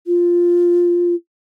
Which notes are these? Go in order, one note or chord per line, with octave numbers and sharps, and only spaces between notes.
F4